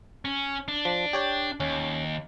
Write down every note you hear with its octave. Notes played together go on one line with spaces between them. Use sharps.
C#4
D4
F3
G4 C#5 G5
D#2 C#4